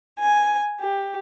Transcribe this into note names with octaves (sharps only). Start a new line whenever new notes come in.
G#5
G4